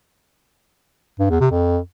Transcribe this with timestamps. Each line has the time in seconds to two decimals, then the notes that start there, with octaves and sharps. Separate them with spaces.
1.19 G2
1.30 E2
1.40 C3
1.51 F2